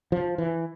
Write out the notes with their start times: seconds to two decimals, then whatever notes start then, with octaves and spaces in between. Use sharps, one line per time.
0.12 F3
0.38 E3